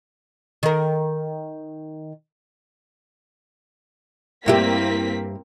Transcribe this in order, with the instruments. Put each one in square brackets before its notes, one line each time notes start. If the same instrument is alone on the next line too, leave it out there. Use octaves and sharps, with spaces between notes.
[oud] D#3 A#4
[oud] G2 E4 G4 [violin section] A#3 C4 B6